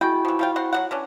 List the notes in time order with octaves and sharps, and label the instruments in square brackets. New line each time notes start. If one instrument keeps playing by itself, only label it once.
[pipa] G#3 G5 [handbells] E4 F#4
[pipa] E3 F3
F3 F4 G5
C4 F#5 C6
F#3 C4 F#5
E3 C#4 D4